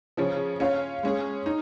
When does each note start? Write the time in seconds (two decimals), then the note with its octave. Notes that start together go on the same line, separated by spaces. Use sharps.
0.17 C#3 F3 C#4
0.60 C#4 F4 C#5 F5
1.03 G#3 C#4 G#4
1.46 D#4